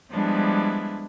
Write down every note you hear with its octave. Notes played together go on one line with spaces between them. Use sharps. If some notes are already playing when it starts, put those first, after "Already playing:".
F3 G3 G#3 B3 D4 E4